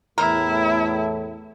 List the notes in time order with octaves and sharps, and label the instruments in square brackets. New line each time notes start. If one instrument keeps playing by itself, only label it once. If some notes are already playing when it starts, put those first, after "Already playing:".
[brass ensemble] E2 A2 [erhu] E4 [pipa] A#4